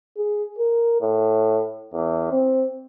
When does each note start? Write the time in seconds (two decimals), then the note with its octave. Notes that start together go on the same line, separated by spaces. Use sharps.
0.18 G#4
0.58 A#4
1.01 A2
1.93 E2
2.31 C4